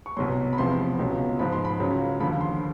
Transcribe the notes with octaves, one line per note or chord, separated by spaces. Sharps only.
C#6
C2 B2 F#3 C6
B5
E2 C3 F3 C6
C#2 B2 F#3
G#2 F3 B5
C6
B5
C#2 C#3 F#3
D#2 D3 F3 B5
C6